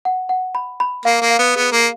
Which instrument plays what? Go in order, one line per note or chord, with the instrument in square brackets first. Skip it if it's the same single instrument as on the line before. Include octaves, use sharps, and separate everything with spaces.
[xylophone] F#5
F#5
B5
B5
[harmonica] A#3 [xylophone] F5
[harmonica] A#3
[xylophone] F5
[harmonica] B3
[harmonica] B3 [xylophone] G#4
[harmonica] A#3
[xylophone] F5